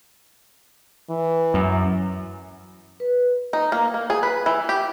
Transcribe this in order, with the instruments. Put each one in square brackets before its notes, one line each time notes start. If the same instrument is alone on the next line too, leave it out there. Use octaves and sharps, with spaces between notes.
[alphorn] E3
[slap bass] F#2
[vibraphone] B4
[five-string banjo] D#4
A#3
A#3
G#4
B4
E3
G4